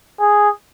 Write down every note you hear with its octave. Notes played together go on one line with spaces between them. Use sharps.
G#4